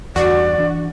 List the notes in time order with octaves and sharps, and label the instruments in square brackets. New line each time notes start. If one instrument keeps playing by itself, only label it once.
[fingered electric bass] E2 G2 [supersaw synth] F#4 [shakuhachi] D5
[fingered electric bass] E3 D4